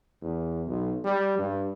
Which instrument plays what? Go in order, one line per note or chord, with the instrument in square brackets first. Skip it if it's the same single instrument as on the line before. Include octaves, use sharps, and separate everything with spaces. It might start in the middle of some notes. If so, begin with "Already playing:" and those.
[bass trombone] E2
B1
G3
G2